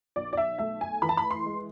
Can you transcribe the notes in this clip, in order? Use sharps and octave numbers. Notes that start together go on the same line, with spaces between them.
B1 D5
D5
E5
A3 E5
G#5
E3 B5
A5
B5
C6
G#3